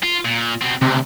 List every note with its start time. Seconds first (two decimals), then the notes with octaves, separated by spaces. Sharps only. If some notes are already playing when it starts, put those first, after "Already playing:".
0.03 F4
0.25 A#2
0.61 B2 C4
0.82 D2 C3